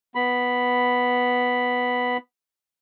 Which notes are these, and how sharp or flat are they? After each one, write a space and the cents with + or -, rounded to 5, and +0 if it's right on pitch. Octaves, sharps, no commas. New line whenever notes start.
B3 +0 B5 +0